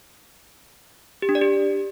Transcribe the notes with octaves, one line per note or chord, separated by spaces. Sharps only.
G4
D4
D5
G4